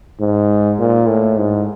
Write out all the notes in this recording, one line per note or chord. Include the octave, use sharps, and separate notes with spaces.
G#2
A#2
A2
G#2